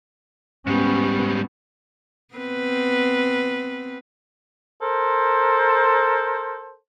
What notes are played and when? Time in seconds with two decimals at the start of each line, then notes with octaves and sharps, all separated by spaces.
0.67 G#2 G3 B3 C#4
2.35 B3 C4 B4
4.81 A4 A#4 C5